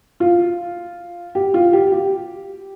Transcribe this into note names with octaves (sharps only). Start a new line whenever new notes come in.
F4
G4
F4
G4
G4